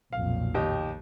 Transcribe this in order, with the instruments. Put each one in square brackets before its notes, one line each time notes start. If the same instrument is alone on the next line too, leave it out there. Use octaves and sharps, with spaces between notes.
[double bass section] B1 F2 A#2 [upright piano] F5
[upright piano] D#2 G4 D#5